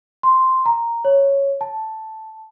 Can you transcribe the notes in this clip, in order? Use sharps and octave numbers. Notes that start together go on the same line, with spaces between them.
C6
A#5
C#5
A5